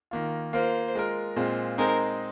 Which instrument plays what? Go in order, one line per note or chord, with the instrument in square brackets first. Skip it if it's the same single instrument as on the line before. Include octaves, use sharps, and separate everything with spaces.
[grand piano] D#3 A#3 F4
[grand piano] A#3 F4 A#4 [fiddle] C5
[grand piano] G#3 F4 A#4
A#2 G#3 C4 F4
[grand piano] G#3 C4 D#4 G#4 C5 [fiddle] A#4